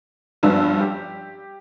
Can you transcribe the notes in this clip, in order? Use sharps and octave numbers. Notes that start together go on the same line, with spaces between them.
F#1 G2 F3 B3 F#4 E6
G4